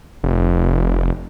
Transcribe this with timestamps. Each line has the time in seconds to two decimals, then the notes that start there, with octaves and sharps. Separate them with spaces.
0.24 F1